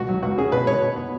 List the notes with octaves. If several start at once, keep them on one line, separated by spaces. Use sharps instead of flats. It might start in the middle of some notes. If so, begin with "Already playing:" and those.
Already playing: C#2 B2 F#4
F#3
C#2 F#4
C#4 G#4
B2 B4
B2 C#5
B2
B3